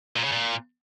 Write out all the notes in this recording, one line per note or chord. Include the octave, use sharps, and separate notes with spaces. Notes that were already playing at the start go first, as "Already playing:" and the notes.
A#2
C#3
A#2